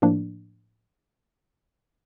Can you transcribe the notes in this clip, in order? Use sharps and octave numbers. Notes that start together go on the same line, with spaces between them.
A2 F3 A#3 D4